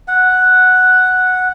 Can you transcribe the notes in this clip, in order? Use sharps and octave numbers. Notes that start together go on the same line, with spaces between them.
F#5